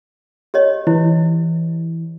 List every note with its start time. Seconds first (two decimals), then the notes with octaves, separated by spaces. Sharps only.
0.54 G4 C#5 D#5
0.87 E3 E4